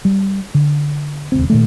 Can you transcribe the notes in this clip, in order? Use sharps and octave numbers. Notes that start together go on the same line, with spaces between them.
G3
D3
E1 D2 C4
A#2 D#3 A3